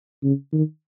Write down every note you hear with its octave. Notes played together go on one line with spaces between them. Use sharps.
C#3
D#3